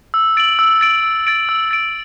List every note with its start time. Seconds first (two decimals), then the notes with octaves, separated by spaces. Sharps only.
0.14 E6
0.37 A6 D7 F#7
0.59 E6
0.81 A6 D7 F#7
1.03 E6
1.27 A6 D7
1.49 E6
1.71 A6 D7